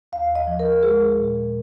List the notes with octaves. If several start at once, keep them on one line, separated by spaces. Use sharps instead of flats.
D#2 F5
D#5
F3
A#4
G#3 G#4
A#2